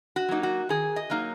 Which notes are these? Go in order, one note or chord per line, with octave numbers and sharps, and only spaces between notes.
F#4
F#3 A#3 D#4
F#4
D#3 G#4
D#5
F#3 A#3 D#4